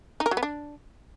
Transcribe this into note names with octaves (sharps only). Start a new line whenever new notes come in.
D#4
A#4
F#3
B3
D4